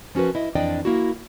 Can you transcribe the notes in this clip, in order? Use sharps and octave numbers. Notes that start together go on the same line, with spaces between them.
F3 C#4 F#4 A#4 B4
E4 D#5
F2 E3 D4 D5 D#5 G5
A#3 E4 F#4